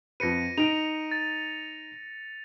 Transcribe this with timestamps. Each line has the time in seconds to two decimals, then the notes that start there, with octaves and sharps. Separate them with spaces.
0.20 F2 B4 A#6 C#7 D#7
0.58 D#4 D7 D#7 F7
1.11 A6